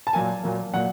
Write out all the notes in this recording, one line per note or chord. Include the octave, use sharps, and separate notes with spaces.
A5
A#2 F#3 A#3 G#5
A#2 F#3 A#3
A#2 F#3 A#3 F#5